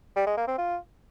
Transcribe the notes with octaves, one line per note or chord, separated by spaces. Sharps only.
G3
G#3
A#3
C4
F4